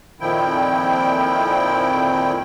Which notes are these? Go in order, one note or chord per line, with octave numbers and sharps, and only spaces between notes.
F2 A#2 D#3 F3 E4 G5